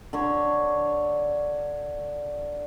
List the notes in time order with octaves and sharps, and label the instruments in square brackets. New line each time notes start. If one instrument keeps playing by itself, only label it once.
[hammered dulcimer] D3 C#5